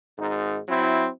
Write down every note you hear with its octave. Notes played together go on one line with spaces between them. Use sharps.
G#1 G#2 D#4
F#3 C4 E4